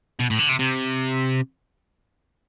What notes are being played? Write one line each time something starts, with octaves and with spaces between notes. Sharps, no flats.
B2
A2
D3
C3
C3